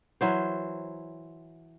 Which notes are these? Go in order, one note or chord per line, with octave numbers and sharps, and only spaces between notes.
E3 F#3 C5